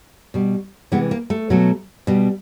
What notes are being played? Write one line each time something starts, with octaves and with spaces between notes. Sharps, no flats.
B2 G3
C3 E3 G#3 B3
A#3
A3
B2 F#3 A3
B2 G3